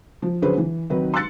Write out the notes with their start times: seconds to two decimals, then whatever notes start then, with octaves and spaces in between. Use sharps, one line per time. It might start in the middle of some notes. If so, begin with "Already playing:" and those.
0.22 F3
0.42 D3 F#3 C#4 G#4 B4 C5
0.58 E3
0.90 C3 D#3 F#3 D#4 B4
1.14 C6 E6 F#6 A6 C#7